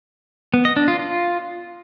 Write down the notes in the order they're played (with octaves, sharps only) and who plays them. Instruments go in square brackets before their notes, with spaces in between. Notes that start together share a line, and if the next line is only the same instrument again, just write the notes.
[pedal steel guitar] B3
D#5
D4
F4
F4